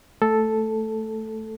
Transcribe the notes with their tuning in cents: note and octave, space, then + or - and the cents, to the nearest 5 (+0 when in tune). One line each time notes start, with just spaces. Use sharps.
A3 +0 A4 +0